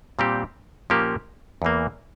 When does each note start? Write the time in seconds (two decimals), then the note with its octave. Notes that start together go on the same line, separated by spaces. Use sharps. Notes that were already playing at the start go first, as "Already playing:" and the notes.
0.19 A#2 G3 C4 G4
0.90 A#2 F3 A#3 C#4 G4
1.62 E2 E3 A#3